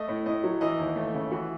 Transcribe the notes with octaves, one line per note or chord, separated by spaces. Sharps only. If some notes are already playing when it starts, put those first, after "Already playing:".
Already playing: A3 D#5
A2
A2 D#5
F#3
E3 D#5
D#2
A3
C#3
E3 F#4